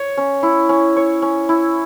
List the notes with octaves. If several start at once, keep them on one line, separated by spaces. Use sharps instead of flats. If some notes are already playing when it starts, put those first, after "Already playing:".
Already playing: C#5
C#4
E4
C#4
C#5
C#4
E4